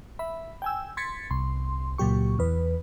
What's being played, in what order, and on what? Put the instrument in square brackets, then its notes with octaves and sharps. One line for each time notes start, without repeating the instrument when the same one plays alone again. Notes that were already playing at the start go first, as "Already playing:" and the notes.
[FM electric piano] E5 B5
G5 G#5 E6
C6 G#6 A6 B6 C#7
C2 C6
C#2 A#2 F#3 G4 C#6
E2 B4